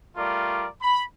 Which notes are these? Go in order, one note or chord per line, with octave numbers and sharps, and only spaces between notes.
G3 A3 F4 A#4 D5
B5